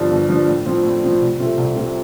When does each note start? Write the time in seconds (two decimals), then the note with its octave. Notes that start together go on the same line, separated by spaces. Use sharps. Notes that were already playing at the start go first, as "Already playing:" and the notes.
Already playing: G1 G2 F3 D4
0.11 G1
0.28 G2 F3 D4
0.47 A2
0.65 F3 C4 F4
0.83 A2
1.02 F3 C4 F4
1.21 C2
1.39 C3 A3 C4 F4
1.57 C2
1.75 C3 A3 C4 F4